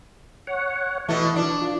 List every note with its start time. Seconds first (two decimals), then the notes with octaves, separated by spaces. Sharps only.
0.47 C#5 F#5
1.09 B2 E3 A3
1.36 D4
1.61 F4